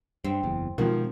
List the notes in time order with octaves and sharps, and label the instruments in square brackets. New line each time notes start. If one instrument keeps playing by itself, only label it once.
[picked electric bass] G2 [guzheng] C4
[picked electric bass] F#1 E2
[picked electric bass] B2 G#3 C4 [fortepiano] D#3 F3 [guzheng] F#4